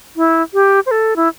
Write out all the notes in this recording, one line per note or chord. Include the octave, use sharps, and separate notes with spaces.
E4
G4
C5
A4
E4